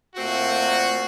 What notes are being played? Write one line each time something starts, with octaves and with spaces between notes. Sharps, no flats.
A#2 A3 C4 F#4